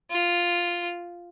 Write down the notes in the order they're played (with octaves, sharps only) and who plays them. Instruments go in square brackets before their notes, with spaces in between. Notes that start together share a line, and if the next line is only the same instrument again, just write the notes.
[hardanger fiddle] F4